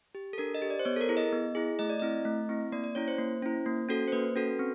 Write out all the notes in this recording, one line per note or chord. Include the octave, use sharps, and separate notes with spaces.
G4
A4
D4 A#4
D#5
G4
D5
C5
B3 C#5
A4
A#4
E4 G#4
D#5
B3
E4 G#4
A3 D#5
D5
C4 E4 D#5
A3
C4 E4
A#3 D5
D5
C#4 E4 C#5
C5
A#3
C#4 E4
A#3
C#4 F#4 A4
C5
A#3 B4
C#4 F#4 A4
C4